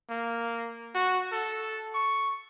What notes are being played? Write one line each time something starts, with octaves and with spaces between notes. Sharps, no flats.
A#3
F#4
A4
C#6